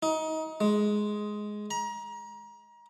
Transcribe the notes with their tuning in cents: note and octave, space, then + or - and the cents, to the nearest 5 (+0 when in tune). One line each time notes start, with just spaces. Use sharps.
D#4 +25
G#3 +10
A#5 +30